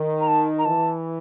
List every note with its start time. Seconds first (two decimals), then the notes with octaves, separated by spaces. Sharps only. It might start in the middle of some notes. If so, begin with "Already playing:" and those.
Already playing: D#3
0.21 A#5
0.28 A5
0.59 A#5
0.65 E3 A5